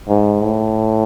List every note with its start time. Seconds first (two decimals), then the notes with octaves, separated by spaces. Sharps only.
0.09 G#2
0.41 A2